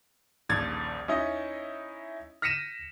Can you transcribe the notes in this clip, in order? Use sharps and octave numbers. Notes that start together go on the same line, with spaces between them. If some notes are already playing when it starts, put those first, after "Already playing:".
D#1 A#1 D#2 G#6 A6
C#4 D#4 E4 D#5
F6 A#6 B6 C#7 D#7 E7